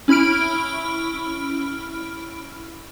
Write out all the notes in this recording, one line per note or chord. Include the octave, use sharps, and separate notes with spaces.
C#4 E4 B5 F6 D7